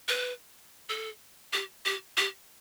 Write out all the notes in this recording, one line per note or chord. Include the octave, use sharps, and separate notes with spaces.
B4
A4
G4
G4
G4